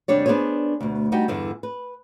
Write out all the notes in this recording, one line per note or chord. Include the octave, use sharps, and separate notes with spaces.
E2 C3 G3 D4 C#5 D5
B3 D4 D#4 G#4 C5 C#5
D2 B2
G3 D#4 F#4 G4 G5
E2 G2 D3 E3
B4